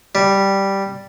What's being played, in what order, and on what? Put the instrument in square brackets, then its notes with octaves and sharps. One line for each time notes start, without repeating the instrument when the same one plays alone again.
[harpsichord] G3